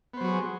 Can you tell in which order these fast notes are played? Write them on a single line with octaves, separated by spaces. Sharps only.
B3 C5 F#3 F#4 G#4